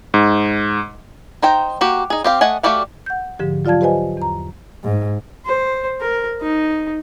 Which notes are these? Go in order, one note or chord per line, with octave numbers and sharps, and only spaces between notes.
G#2
D#4 C5 G5 A#5
A#3 F#4 G4
D#4 G#4
C4 G4 F5
A3 D#5 F#5 G#5
A3 F#4 G4 D5 F5
F#5 G6
G#2 D3 F3 G4
F#3 F4 D5 F5 A5 G#6
G4 B4 C5 D#5 G#5
E2 A#5
G#2
C5
A#4
D#4